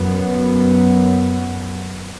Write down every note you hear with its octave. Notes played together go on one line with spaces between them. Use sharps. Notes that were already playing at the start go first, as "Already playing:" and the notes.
Already playing: F#2 F#3 B3